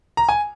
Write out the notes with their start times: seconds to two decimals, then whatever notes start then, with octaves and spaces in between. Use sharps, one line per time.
0.17 A#5
0.29 G#5